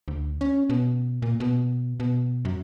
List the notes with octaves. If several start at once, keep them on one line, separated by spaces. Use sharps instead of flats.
D2
C#4
B2
A#2
B2
B2
F#2